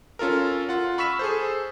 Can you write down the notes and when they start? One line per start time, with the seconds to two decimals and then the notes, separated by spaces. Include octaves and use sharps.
0.19 C#4 F4 A4 A#4
0.69 F4 F#5
0.98 B5 C#6 E6 F6 B6 E7
1.19 G#4 A4 C5